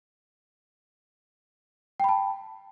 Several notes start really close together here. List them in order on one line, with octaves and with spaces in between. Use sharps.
G5 B5 A5